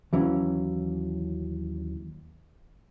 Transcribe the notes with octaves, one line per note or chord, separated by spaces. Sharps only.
D#2 E3 F#3 C#4